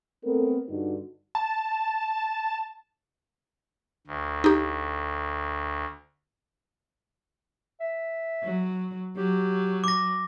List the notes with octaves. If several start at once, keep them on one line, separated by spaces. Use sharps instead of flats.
A3 B3 C4 A4 A#4
G2 D3 D#4 F#4
A5
D2
D#4 G4
E5
F#3
F#3 G4
D6 A#6